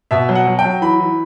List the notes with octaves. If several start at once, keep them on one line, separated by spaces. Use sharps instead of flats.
B2 E5
F#3
F#5
F#3
G5
F#3
E3 B5
E3